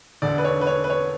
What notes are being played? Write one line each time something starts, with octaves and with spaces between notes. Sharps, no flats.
E1 D2 D3 D5
B4
C#5
B4
C#5
B4
C#5